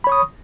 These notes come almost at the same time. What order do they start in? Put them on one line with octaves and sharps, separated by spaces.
B5 C#5 C#6 D#6